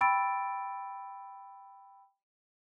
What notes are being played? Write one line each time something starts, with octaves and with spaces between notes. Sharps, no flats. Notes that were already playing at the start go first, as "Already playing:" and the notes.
G5 B5 C#6 E6 A6 D7